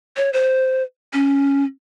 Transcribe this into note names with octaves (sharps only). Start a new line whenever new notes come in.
C#5
C5
C#4